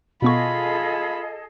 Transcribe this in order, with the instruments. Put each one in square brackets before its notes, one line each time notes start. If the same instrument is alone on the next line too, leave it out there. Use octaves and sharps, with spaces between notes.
[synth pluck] B2 B3 C#6 [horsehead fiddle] F4 B5 [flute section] G#4 A4 D#5